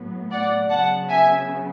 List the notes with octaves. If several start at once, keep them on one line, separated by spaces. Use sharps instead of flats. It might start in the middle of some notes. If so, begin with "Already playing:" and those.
Already playing: A2 F#3 B3
D5 F#5
C#3 F#3 B3 F#5 A5
E5 G#5